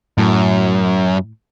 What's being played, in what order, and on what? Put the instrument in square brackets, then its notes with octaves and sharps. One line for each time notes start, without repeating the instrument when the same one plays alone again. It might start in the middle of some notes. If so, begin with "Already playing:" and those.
[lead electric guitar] F#2 [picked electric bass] A2